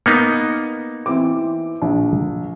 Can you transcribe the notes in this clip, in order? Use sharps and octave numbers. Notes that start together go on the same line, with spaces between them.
A#3 B3 D#4 C#7
E3 C4 D6
A#1